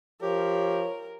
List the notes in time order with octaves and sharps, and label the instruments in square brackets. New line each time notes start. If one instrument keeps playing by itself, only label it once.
[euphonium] F3 [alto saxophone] G4 [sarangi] A#4 [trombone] C#5